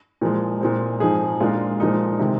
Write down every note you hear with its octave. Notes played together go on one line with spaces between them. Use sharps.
A#2 F3 G#3
A#2 G#3 C4
G#2 F3 C4 D#4 G#4
A#2 G#3 D4 F4
A#2 F3 G#3 D#4
C3 D#3 G#3